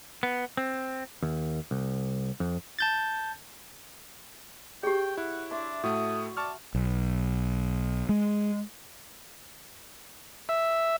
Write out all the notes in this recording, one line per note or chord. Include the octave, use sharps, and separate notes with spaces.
B3
C4
D#2
C2
F2
A5 G6 A6
G4 G#4 C#5 G5
E4 F#5
D4 E5 C6
A2 A3 F#4 D#6
D5 A5 C#6 F6
B1
G#3
E5